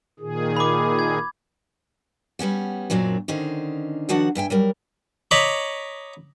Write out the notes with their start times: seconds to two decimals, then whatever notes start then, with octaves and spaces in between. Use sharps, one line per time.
0.19 A#2 D#3 G#4
0.57 B5 D6
0.99 G#6
2.39 G3 B3 C#4 F#4
2.90 F#2 A#2 F#3 C4 D4
3.28 D3 D#3 C#4 D#4 C5
4.09 D#3 F3 D4 F#4 F#5
4.35 G2 E5 G5 G#5
4.50 F#3 G3 A#4
5.31 C#5 D#5 A#5 B5 C#6 D6